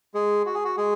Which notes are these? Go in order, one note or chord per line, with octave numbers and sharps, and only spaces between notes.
G#3 G#4
F#4
G#4
F#4
G#3 G#4